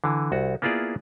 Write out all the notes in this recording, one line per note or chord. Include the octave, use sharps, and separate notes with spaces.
D3 E3
C2 F#4
A#3 B3 E4 F4 G#4 D5